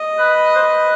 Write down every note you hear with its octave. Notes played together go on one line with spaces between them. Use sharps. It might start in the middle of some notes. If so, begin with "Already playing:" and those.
Already playing: D#5
B4
C5
B4